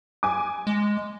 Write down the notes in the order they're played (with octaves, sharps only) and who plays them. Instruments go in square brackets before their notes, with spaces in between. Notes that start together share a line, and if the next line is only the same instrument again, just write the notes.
[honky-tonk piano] G#5 D6
[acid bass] G#3